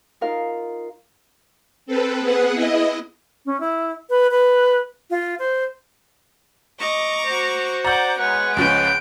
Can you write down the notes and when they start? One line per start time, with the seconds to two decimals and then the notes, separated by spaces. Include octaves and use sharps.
0.21 D#4 F4 A#4 F5
1.86 C4 A4 B4
2.20 B3 G#4 F#5
2.53 E4 D#5
3.46 C#4
3.60 E4
4.10 B4
4.31 B4
5.10 F4
5.39 C5
6.79 D#5 A#5 C#6 D6
7.27 F#4 C5
7.85 D5 F#5 A#5 D6 G6
8.19 G#3 B3 C#5 F#5
8.57 C#2 F3 C#4 B4 G6 D7